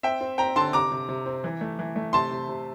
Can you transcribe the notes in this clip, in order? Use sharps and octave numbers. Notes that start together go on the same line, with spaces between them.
C4 E5 G5
C4
C4 G5 A#5
D3 A5 C6
C3 A#5 D6
C3
C3
C4
E3
A3
E3
A3
C3 A5 C6
C3
C3